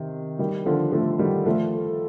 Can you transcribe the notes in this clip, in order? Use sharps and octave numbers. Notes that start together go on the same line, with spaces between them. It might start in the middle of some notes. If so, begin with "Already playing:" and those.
Already playing: C3 D#3
D#3 G3
D3 F3
F3 A3
D#3 G3
F3 A3